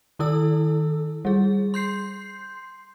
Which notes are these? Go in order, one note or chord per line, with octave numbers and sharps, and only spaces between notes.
D#3 E4 A4 E6
G3 G#4
C6 G6 C7